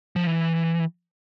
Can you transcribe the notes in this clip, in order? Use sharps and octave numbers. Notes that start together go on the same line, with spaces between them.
F3
E3